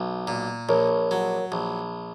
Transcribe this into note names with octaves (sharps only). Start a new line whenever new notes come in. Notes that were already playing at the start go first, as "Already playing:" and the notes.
Already playing: B1
A#2
A#1 A#4 C#5
F#3
A#1